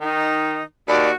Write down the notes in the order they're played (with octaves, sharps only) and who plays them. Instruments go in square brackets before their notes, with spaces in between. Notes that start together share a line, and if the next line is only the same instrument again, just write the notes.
[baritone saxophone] D#3 [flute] D#4
[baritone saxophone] D#2 [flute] F#4 [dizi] D5